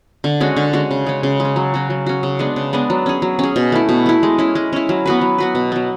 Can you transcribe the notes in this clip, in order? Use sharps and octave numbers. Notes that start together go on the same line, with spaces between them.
D3
G#3 C#4 F#4
D3
G#3 C#4 F#4
C#3
G#3 C#4
C#3
G#3
C#4
F#3
C#4 F#4
F#3
C#4 F#4
C#3
G#3 B3 D4
C#3
G#3 B3 D4
F#3
C#4 G#4
F#3
C#4 G#4
B2
A3 E4
B2
A3 E4
G#3
C#4 E4
G#3
C#4 E4
F#3
B3 F#4 B4
F#3
B3 F#4 B4
B2
F#3 B3